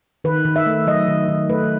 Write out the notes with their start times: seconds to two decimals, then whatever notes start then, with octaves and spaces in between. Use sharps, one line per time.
0.24 D#3 B4
0.45 D#3
0.56 E5
0.66 A3
0.87 F#3 D#5
1.08 D#3
1.29 D#3
1.49 A3 B4